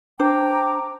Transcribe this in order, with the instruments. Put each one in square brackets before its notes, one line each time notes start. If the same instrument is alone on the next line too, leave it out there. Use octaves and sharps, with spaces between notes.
[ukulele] D4 C5 [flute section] G5 A#5 [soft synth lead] D6